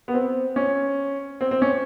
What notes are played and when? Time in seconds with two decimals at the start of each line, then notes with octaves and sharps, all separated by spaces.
0.08 B3
0.14 C4
0.56 C#4
1.41 C4
1.51 C4
1.62 C#4